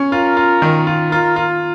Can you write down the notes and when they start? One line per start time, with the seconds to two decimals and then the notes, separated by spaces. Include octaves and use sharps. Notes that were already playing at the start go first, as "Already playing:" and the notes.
Already playing: C#4
0.12 F4 A#4
0.37 F4
0.62 D#3
0.87 F4
1.11 F4 A#4
1.36 F4